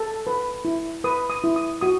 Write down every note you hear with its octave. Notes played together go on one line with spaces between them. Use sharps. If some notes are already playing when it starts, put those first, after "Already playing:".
Already playing: A4
B4
E4
B4 D#6
D#6
E4
D#6
F#4 D#6